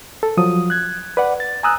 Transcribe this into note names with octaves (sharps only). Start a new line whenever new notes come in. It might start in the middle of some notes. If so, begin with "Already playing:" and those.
A4
F3 F#3 D#6
F#6 G#6
B4 D5 F#5
A6
G#5 A#5 D#6 E6 F#6